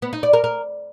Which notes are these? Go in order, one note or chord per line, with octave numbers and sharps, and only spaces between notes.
B3
D#4
D5
A#4
A#4